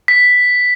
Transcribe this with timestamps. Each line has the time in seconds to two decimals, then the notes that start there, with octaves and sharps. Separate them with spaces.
0.08 B6